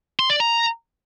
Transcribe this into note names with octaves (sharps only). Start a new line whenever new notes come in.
C6
D5
A#5